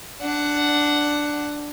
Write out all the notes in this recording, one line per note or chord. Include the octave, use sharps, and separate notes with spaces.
D4 F#5